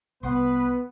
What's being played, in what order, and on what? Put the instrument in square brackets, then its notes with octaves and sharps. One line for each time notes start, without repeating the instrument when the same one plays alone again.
[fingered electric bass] C2 [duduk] B3 [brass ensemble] B4 [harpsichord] F#5 C6